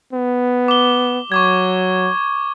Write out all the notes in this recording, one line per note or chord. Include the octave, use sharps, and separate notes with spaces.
B3
D6 G7
F#3 C#6 D6 G#6